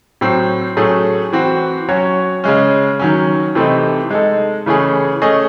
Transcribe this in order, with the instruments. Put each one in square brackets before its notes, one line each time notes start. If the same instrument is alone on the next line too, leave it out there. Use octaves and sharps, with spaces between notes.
[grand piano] A2 F#3 C4
A2 F#3 A3 C#4 G#4
E3 C4 F#4
F#3 C#4 F#4 C#5
C#3 G#3 C#4
D#3 F#3 C#4
C3 E3 A3 C4 D#4
G#3 D#4 A4
C#3 E3 A3 C#4 G#4
A3 C#4 G#4 D#5